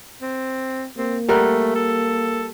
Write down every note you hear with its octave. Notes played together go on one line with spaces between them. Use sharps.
C4
A#3 C4
G3 A3 A#4 F#5
A4